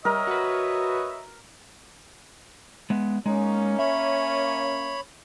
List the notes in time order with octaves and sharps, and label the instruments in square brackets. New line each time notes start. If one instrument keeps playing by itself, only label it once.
[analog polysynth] G3 [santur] A#4 [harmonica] C#5 D#5 E5
[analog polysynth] F#4 B4
[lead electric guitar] G#3 B3
[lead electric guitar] G#3 [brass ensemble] A#3 C#4 [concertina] D#4
[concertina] C#5 B5 [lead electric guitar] E5